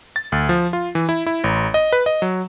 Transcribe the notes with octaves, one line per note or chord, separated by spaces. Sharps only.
A6
D2
F3
F4
E3
E4
E4
A1
D#5
B4
D#5
F#3